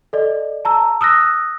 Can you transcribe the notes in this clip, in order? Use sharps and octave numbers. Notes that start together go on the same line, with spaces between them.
A4 D5 D#5
A5 A#5 E6
D#6 E6 F#6 A#6